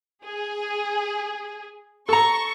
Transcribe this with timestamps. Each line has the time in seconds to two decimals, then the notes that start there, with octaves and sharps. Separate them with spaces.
0.24 G#4
2.09 A4 A#5 C#6